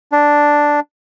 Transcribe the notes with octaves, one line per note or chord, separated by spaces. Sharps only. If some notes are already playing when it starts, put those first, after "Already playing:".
D4